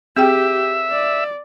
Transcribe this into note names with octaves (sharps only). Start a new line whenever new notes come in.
C4 G4 G#4 E5 G5
D5